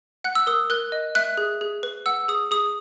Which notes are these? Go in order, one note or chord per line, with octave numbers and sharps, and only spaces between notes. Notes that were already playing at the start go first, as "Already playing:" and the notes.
F#5 F#6
E6
A#4 D#6
A#4 F#6
D#5
E5 F#6
G#4
G#4
B4
F#5 E6
G#4 D#6
G#4 D#6